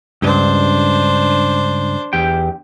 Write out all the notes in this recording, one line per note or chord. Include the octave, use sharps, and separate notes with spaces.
C#2 G2 D4 C5
E2 G4 G5